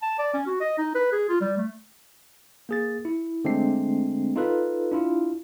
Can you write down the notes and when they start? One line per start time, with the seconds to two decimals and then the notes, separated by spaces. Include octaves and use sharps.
0.02 A5
0.18 D5
0.34 C#4
0.46 F#4
0.61 D#5
0.78 D#4
0.95 B4
1.12 G#4
1.29 F4
1.41 G3
1.57 A3
2.69 A#3 G#4 A6
3.05 E4
3.45 D3 G#3 A3 C4 D4 C7
4.36 D#4 F4 A4 B4
4.92 D4 E4 F4